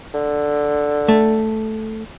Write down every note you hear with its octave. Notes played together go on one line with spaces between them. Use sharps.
D3
A3